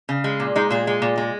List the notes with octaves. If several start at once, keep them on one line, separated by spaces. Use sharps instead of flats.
C#3
G#3
A#2
G#3 D#4
A#2 G#4
G#3
A#2
G#3